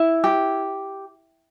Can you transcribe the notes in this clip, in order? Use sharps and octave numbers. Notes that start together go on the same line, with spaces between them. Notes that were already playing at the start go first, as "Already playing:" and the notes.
Already playing: E4
G4